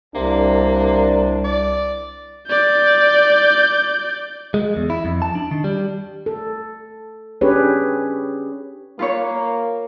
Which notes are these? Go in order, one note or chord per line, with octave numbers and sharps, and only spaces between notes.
C2 C3 A#3 D4
D5
D5 G6
G#3
E2
E4
F2
A5
D4
D#3
G3
A4
C#4 D4 G4 G#4 B4 C#5
A#3 F4 B4 C#5